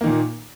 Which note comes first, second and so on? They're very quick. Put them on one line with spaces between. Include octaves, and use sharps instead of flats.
A#3 D#3 A#2